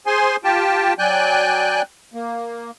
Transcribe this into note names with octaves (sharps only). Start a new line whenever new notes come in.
G#4 C5 G#5 C6
F4 G4 G5 A5
F#3 D5 G5 G#5 F#6 G6
A#3